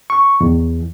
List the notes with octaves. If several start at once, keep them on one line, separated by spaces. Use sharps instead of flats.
C#6
E2